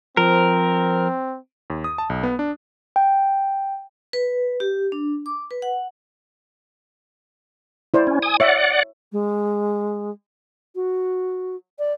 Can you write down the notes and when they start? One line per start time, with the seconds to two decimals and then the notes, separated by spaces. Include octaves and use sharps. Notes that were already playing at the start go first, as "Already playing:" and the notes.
0.17 F3 C4 A#4
1.70 D#2
1.84 D#6
1.98 A5
2.10 B1
2.23 B3
2.39 D4
2.96 G5
4.13 B4
4.60 G4
4.92 D4
5.26 D6
5.51 B4
5.62 F#5
7.94 E4 C5 D5
8.07 C#4
8.22 G#5 D#6
8.40 C#5 D5 E5 F#5
9.12 G#3
10.75 F#4
11.79 D5